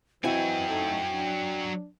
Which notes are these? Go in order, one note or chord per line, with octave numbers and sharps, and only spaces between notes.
E3 F#3 C4 E4 F#4 D#5 G5 G#5
A3 D#4
D4